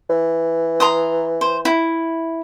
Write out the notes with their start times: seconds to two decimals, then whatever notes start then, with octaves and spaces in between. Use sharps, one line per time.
0.10 E3
0.80 A#5 C6 D#6
1.41 C5
1.65 E4